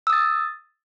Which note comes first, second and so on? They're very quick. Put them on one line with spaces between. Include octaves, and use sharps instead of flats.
E6 D#6 A6